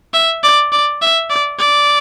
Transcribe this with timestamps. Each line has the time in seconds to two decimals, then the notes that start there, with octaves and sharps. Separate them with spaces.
0.14 E5
0.43 D5
0.72 D5
1.02 E5
1.30 D5
1.59 D5